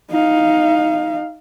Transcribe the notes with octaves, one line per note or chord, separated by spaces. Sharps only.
D#4 F5